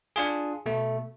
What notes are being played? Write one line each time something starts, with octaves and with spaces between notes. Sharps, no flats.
D4 F4 G#4
B2 A3